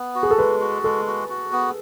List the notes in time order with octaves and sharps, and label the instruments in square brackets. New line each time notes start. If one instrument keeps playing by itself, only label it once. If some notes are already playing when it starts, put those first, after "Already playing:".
Already playing: [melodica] B3
F#4
[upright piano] G#4
A4
[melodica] G#3 [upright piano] B4
[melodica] F#4
[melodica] G#3 [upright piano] A4
[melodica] F#4
F#4
B3